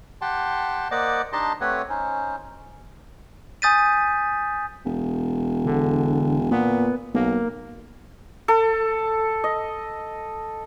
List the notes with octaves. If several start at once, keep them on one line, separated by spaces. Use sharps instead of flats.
G4 F#5 G5 A5 C6
A#3 C5 D5 D#5 F#5 D6
D4 D#4 G4 D#5 A5 C6
A3 C4 G4 B4 C#5 F#5
C#4 D#4 C5
G#5 D#6 G6 A6 B6 D#7
E1
D3
A#2 B3
B1 A#3
A4
D#5